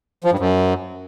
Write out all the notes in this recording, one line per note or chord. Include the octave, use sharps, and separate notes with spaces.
F3
G2
F#2